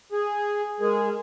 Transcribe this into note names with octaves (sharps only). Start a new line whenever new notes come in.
G#4
G#3 G#4 A#4